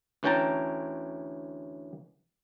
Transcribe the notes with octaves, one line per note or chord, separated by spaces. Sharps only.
D2 E3 C#4 G5 A5 A#5